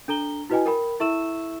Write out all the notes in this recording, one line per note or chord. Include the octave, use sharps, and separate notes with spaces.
D4 A4 A#5 G7
E4 F#4 B4 D#5 G5 G#5
A#4 G5 B5
E4 A4 E5 C#6 E6 E7